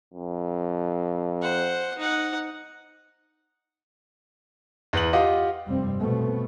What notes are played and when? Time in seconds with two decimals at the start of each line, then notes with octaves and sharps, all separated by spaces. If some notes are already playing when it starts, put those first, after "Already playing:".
0.14 F2
1.42 C5 F#5
1.98 D#4 F#5
4.93 E2 B4 F#7
5.13 F4 G4 D#5 F5 F#5
5.66 F1 G2 G3 C4
5.99 B2 A3 B3 C4